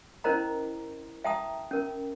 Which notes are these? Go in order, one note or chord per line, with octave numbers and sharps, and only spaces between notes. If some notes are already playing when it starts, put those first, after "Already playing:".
C#4 E4 A#4 C5 D#5 A#5
E5 G5 A5 A#5 D#6
C#4 A#4